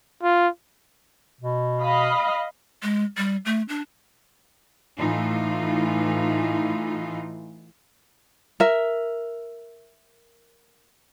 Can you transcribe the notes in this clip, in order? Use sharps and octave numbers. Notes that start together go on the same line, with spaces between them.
F4
B2
D#5 F5 B5
G#3
G3
A3
D4
A2 E3 D#4 F4
A#4 E5